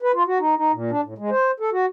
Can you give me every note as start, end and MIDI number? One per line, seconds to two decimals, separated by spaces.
0.02 0.12 71
0.14 0.23 65
0.27 0.38 66
0.40 0.55 63
0.57 0.72 63
0.73 0.91 46
0.91 1.01 62
1.03 1.14 45
1.18 1.30 56
1.30 1.51 72
1.60 1.70 69
1.72 1.86 66